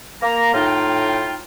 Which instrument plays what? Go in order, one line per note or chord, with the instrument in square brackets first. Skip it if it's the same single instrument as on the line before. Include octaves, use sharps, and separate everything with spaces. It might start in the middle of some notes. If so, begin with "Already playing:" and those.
[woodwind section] A#3 A#5
A2 D#4 F4 G5